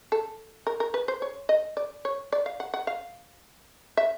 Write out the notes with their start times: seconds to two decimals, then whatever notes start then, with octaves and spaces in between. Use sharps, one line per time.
0.12 A4
0.67 A#4
0.80 A#4
0.94 B4
1.08 C5
1.22 C#5
1.49 D#5
1.77 D5
2.05 C#5
2.32 D5
2.46 F5
2.60 F#5
2.74 F#5
2.87 F5
3.97 E5